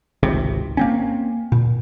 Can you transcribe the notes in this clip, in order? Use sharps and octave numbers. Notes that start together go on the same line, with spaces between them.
G#1 C#2 C3
A#3 C4 C#4
A#2